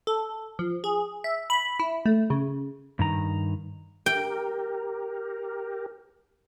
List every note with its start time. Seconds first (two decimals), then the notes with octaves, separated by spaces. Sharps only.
0.07 A4
0.59 F3
0.84 G#4
1.24 E5
1.50 B5
1.80 E4
2.06 A3
2.30 C#3
2.99 G2 D#3 A#5
4.06 G4 A#4 G5